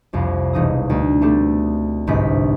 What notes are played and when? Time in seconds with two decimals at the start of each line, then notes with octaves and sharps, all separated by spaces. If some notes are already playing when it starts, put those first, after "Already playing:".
0.13 F1 C2 F2
0.53 E1 D#4 D#6
0.90 D2
1.21 A3 B3 C4 G4 A4
2.07 G1 C2 G#2 D#4 B6